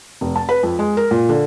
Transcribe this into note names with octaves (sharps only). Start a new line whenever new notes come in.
F1
A5
B4
F2
G#3
A#4
A#2
D3